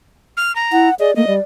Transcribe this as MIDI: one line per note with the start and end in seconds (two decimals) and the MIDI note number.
0.37 0.54 89
0.56 0.89 82
0.72 0.90 64
0.72 0.94 78
1.00 1.12 68
1.00 1.13 74
1.00 1.11 75
1.16 1.25 57
1.16 1.25 58
1.16 1.34 75
1.27 1.39 55
1.27 1.41 74